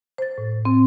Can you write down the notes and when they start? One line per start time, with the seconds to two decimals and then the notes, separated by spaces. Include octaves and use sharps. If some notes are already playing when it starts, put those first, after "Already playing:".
0.18 C5 A6
0.38 A2
0.65 C4